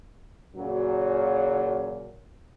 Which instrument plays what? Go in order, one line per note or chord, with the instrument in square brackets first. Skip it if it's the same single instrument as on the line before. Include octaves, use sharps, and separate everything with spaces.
[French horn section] F#2 A#2 C#3 F#3